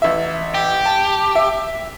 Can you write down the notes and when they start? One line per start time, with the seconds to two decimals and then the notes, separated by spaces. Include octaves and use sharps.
0.02 A1 E5
0.54 G4
0.86 A5
1.35 E5